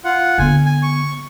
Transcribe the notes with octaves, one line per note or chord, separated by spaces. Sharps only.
F4 F#5
D3 B3 G#5
G#5
C#6